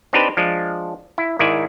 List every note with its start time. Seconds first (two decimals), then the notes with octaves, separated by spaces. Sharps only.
0.13 C4 D4 D#4 G4 B4 C5
0.37 F3 G#3 D4
1.18 E4
1.39 G#2 D#3 E4 D5 G#5